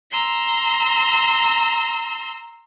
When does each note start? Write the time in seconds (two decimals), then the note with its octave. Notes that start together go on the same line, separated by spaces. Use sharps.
0.13 A#5 C6 E6